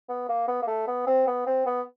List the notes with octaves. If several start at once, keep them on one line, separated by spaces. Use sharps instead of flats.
B3
A#3
B3
A#3
A3
B3
C4
B3
C4
B3